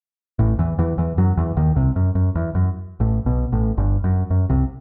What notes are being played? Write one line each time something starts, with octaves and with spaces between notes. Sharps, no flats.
A1 A2
E2 E3
E2 E3
E2 E3
F#2 F#3
E2 E3
D#2 D#3
C2 C3
F#2
F#2
E2
F#2
A1 A2
B1 B2
A1 A2
G1 G2
F#2
F#2
C2 C3